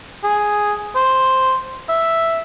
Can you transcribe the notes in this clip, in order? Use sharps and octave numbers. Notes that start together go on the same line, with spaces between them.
G#4
C5
E5